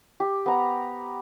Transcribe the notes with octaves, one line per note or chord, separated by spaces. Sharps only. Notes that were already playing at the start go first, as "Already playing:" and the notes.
G4
B3 A#5